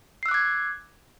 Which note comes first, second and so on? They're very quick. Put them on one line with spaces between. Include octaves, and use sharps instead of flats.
C7 E6 F#6 D6 G#6